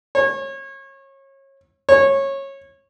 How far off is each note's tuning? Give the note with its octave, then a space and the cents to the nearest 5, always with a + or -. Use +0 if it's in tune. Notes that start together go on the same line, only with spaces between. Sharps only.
C#5 -30
C#5 -20